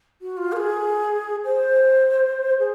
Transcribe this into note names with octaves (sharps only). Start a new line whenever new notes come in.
F#4
F4
A#4
G#4
C5
G#4